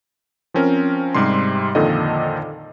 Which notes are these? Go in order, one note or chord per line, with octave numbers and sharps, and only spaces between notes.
F3 C4 C#4 A#4
G#2 C3 G3 C6
F2 A#2 D3 D#3 A4 D#5